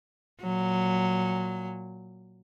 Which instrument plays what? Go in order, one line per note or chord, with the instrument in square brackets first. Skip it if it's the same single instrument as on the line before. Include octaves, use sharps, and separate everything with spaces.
[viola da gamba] A#2 F#3